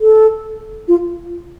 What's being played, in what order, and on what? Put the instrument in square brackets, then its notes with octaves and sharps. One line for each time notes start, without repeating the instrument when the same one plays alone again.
[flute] A4
F4